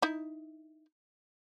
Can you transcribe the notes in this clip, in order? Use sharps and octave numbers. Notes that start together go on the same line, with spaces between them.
D#4 E4